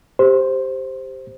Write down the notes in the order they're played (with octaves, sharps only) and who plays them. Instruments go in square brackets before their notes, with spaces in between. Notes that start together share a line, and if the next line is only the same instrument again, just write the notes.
[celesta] G4 [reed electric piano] C5